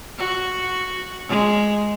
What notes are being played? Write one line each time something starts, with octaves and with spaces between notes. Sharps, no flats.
F#4
G#3